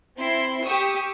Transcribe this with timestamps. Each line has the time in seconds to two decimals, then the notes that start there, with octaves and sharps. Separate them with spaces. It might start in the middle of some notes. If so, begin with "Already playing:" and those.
0.17 C4 E4 C6
0.65 G4 C#6 D#6 E6